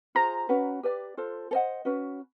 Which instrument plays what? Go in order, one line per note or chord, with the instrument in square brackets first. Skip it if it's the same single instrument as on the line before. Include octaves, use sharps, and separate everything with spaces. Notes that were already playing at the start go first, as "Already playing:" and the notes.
[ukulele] F4 G#4 C5 [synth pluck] A#5
[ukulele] C#4 F#4 B4
G4 B4 D5
F4 A4 C5
A4 C5 D#5 F#5
C#4 F#4 B4